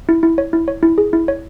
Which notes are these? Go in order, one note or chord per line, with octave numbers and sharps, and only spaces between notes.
E4
E4
C#5
E4
C#5
E4
G#4
E4
C#5